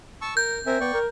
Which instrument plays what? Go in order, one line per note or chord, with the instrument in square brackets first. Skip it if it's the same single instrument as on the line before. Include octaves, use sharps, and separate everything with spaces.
[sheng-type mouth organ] A5 C#6 E6
[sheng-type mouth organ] A#4 [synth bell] G6
[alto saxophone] C4 [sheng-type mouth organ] A#4 E5 G#5
[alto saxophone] B3 [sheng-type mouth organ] D5 G5 C#6
[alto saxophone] A#4